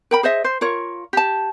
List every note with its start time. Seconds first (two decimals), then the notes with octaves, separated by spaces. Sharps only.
0.11 A#4 G5 B5
0.23 G#4 C5 D#5 E5
0.44 C5
0.61 F4 A#4 C#5
1.13 G4 A5